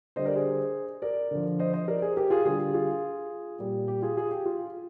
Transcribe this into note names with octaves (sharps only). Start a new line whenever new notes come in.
D3 G3 C5 D#5
A#4 D5
G#4 C5
A#4 D5
D3 F3
C5 D#5
C5 D#5
A#4 D5
G#4 C5
G4 A#4
F4 G#4
D3 G3 F4 G#4
F4 G#4
A#2 G3
G4
F4 G#4
F4 G#4
G4
F4